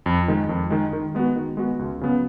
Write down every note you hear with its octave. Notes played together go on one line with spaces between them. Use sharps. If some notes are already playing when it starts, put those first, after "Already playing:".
F2
D#3 G#3
F2
D#3 G#3
D#3
G#3 B3 F#4
D#3
G#3 B3 F#4
C#2
C#3 F#3 B3